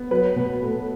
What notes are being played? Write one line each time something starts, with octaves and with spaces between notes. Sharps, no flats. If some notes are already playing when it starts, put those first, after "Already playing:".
Already playing: B3
F#3 B4
B2
A3